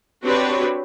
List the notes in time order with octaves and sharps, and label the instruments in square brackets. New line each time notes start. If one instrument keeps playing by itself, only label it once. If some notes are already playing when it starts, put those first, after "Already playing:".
[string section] C4 D4 F#4 G4 B4 C#5